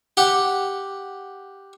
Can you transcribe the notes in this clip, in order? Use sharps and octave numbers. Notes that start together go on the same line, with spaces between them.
G4 F#5